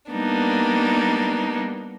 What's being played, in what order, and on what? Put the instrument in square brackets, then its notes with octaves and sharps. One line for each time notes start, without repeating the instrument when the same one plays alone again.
[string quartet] G3 A#3 B3 D4 D#4